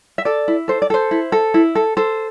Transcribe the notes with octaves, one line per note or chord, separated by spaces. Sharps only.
E5
A4 D5
E4
A4 C5
D5
A4 C5
E4
A4
E4
A4
A4 C5